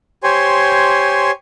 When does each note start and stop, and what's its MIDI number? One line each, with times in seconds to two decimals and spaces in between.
0.23 1.31 67
0.23 1.31 72
0.23 1.31 73
0.23 1.31 80
0.23 1.31 84